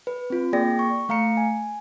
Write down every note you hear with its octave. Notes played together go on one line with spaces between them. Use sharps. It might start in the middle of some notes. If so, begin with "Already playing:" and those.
B4
C4 F4
A#3 G#4 D5 G5 A#6
C#6
A3 F5 A#5 C#7
G#5